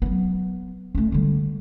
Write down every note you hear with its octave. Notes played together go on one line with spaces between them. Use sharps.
F#3 B3
A3 C#4
D3 G3